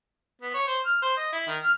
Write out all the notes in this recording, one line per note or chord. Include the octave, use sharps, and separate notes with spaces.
B3
C#5
C5
F6
C5
D#5
E4
D#3
F6